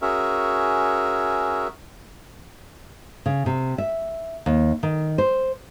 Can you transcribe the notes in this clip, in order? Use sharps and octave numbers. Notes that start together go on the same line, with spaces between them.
C#4 F#4 G#4 A#4 E5
C#3
C3
E5
D#2
D#3
C5